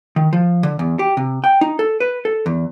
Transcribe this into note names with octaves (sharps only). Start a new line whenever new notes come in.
D#3
F3
D3
E2
G4
C3
G5
D#4
A4
B4
A4
E2